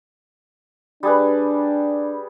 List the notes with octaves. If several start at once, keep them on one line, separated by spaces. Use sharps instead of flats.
G3 D4 G#4 B4